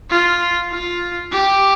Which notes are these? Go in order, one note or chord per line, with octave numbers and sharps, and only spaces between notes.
F4
F4
G4